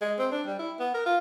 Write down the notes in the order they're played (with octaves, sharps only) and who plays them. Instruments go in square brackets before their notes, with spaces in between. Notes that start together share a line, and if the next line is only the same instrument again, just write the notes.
[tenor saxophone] G#3
C4
D4
G3
E4
B3
A#4
F4